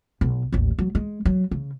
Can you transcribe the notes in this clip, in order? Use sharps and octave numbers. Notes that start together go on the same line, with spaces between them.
B1
A1 D#2
F#3
G#3
F#3
C#3